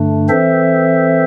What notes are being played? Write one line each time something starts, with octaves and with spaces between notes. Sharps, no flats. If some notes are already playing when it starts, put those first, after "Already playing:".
Already playing: G2 D3 A3 D4
E3 C4 A4 C5 E5